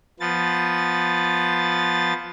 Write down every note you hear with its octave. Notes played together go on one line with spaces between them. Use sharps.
F3 B3 A6